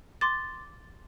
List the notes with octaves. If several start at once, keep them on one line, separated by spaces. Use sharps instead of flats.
C6 D6 A6